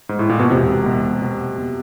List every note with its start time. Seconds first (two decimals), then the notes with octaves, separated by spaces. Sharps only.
0.09 G#2
0.19 A2
0.29 A#2
0.39 B2
0.50 E1 C3
0.86 B2
1.22 B2
1.58 B2